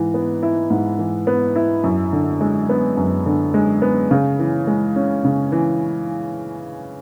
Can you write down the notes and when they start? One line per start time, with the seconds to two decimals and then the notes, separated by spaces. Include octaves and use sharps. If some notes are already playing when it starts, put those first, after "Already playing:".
Already playing: G#2 E3
0.14 B3
0.43 E4
0.70 G#2
0.99 E3
1.27 B3
1.56 E4
1.84 F#2
2.13 D3
2.41 G#3
2.69 B3
2.97 F#2
3.26 D3
3.54 G#3
3.82 B3
4.11 C#3
4.39 E3
4.67 G#3
4.96 C#4
5.24 C#3
5.52 E3